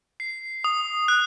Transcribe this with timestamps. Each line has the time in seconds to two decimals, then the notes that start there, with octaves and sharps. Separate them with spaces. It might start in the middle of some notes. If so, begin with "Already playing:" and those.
0.20 C7
0.64 D#6
1.08 F#6